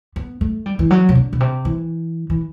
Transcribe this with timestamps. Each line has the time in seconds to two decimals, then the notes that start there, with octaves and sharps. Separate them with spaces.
0.16 B3
0.41 A3
0.66 G3
0.79 E3
0.91 F#3
1.09 C3
1.15 D3
1.33 B2
1.40 C3
1.65 E3
2.30 E3